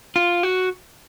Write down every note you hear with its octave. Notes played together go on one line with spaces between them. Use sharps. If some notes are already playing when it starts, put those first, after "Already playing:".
F4
F#4